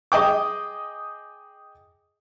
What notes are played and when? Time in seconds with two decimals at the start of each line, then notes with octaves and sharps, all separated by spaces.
0.12 G#4 D#5 G5 D6